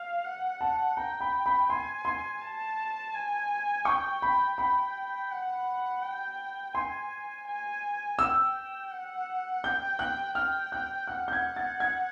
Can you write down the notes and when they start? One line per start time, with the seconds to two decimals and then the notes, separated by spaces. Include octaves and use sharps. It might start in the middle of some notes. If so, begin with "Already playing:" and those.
Already playing: F5
0.24 F#5
0.61 A5
0.97 G5 A#5
1.21 B5
1.46 B5
1.70 G#5 C6
2.05 C6
2.41 A5
3.14 G#5
3.85 G5 C#6
4.22 B5
4.58 G5 B5
5.31 F#5
6.02 G5
6.74 G#5 C6
7.47 G#5
8.19 G5 E6
8.91 F#5
9.64 G5 G6
9.99 F#6
10.35 G5 F6
10.72 F#6
11.08 F#5 F#6
11.28 G6
11.33 G#6
11.56 A6
11.80 G#6